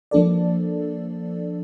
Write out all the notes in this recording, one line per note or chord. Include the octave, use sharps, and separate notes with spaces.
F3 A#3 D4 A4 D5